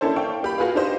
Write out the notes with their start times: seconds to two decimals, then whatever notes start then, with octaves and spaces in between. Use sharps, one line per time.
0.01 A#3 C#4 D4 E4 A4 C5
0.16 D5 F5 G5 C#6
0.43 A#3 G4 B5
0.58 F4 F#4 G#4 B4 F5
0.75 D4 D#4 G4 C5 D#5